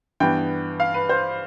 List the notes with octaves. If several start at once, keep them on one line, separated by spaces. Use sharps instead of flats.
G2 E3 B3 G5
F5
B4
C5